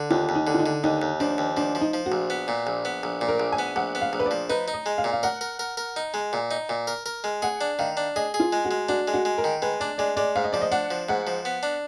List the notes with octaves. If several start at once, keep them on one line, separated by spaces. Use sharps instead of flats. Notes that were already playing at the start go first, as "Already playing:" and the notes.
Already playing: D3
D#2 F4
D#2
D#4
D3
F4
D#4
D3
D#2 D#4
D#2
F3 D4
D#2
F3 D4
F3
D#4
F3
F#4
A#1
B3
A#2
A#1
B3
A#1
A#2
A#4
A#1
G#5
B3
A#1 F#5
B3
F5
A#1
B4
D5
F3
D#4 B4
D#4
D#5
G#3
F5
A#2
F5
A#4 F#5
A#4
A#4
A#4
D#4
G#3
A#2
D#4
A#2
A#4
A#4
G#3
G#4 F#5
D4
D#3 F5
D4
G#4 D#5
G#4
F4
G#3
F#4
G#3
D4 F#4
G#3
F#4
G#3
A#4
D#3
G#3 B4
D4 D5
G#3 D5
G#3 D5
G#2 F5
D#5
F3 D5
D#5
D4 F#5
F3
G#2 F#5
F3
B3
D4